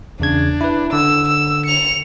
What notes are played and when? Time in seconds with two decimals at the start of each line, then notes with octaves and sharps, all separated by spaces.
0.20 E2 C#3 D4 G#6
0.61 E4 B4
0.93 D3 E6
1.28 E6
1.66 C#7 F7